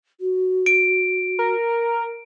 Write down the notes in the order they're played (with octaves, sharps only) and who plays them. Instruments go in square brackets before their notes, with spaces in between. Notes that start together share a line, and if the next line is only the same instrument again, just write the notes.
[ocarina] F#4
[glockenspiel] D7
[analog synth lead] A#4